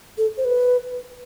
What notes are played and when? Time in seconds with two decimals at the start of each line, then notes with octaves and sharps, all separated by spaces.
0.18 A4
0.37 C5
0.45 B4